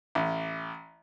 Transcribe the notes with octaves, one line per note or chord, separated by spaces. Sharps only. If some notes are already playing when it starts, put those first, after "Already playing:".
A1